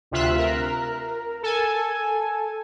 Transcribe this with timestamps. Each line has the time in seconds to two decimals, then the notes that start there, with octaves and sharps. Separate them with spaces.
0.11 D2 C3 F4 E5 F#6
0.39 A#4
1.43 A4 G#5